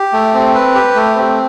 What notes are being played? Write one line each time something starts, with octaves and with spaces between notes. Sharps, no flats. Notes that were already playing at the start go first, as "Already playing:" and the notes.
Already playing: G4
A3
C4
B4
G4
A3
C4